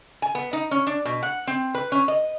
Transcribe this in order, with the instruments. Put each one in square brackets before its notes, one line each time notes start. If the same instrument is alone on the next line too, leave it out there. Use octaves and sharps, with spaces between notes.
[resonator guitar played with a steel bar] G#5
B3
D#4
C#4
D4
B2
F#5
C4
B4
C#4
D#5